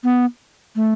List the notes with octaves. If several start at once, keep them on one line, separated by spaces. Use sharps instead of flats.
B3
A3